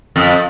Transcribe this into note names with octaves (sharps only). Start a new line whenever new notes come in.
F2